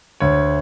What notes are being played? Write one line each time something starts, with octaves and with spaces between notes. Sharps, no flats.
D2 C#5